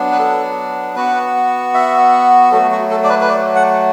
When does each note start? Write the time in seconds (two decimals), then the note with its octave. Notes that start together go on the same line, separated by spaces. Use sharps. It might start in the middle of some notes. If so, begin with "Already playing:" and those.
Already playing: F#3 B3 D4
0.12 B4
0.19 A4
0.96 B3 F#4 B4
1.74 E5
2.51 F#3 A3 F#4 A4
2.71 F#4
2.90 A4
3.04 D5
3.09 B4
3.21 B4
3.29 D5
3.55 F#5